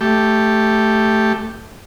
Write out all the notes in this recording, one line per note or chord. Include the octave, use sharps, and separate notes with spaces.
A3 G4